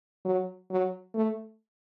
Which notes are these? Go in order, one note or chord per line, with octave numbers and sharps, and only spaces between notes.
F#3
F#3
A3